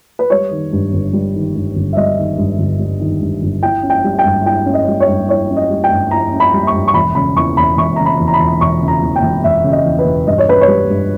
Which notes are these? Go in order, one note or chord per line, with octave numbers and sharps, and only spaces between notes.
B4
G3 C#5
D#3
G2
G1
G3
D#3
G2
G1
E5
G3 D#5
D#3
G2
G1
G3
D#3
G2
G1
E4 G5
C#4
G5
G3
G5
G2
E4 G5
C#4
D#5
G3
C#5
G2
E4 C#5
C#4
D#5
G3
G5
G2
E4 A#5
C#4
B5
G3
C#6
G2
C#6
E1 B5
C#3 B5
E2 C#6
E1 B5
E1 C#6
C#3 A#5
B5
E2
A#5
B5
E1
E1 C#6
C#3
A#5
E2
G5
E1
E1 E5
C#3
D#5
E2
B4
E1
G2 D#5
C#5
C#4 B4
C#5
G3
G2